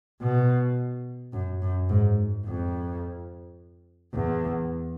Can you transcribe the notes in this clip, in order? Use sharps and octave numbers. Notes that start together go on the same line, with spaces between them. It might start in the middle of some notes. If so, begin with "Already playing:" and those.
B2
F#2
F#2
G#2
F2
E2